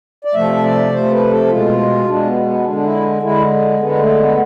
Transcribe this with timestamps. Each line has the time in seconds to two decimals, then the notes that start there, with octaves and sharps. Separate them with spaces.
0.25 D5
0.34 C3 F3 A3 E5
0.63 D5
0.92 C3 F3 A3 C5
1.11 B4
1.31 A4
1.49 B2 G#3 F4
2.07 B2 G#3 D4
2.26 B3
2.45 B3
2.64 D3 G#3 D4
2.76 D4
2.84 E4
3.22 D3 G#3 E4
3.80 D3 G#3 B3
3.99 A3
4.19 B3